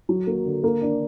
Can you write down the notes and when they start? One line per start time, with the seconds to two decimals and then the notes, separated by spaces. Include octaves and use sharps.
0.09 F#3
0.27 A#3
0.45 D3
0.64 A#3
0.81 D4